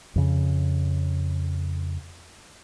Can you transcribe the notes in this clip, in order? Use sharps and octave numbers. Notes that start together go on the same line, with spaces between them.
F2 C#3